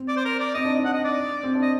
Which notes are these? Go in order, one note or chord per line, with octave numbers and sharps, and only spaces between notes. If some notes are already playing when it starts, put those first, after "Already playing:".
Already playing: C4
D5
C5
A#4
D5
C4 D#5
D4
D#4
D4 F#5
D#5
D5
C4
D4
D#5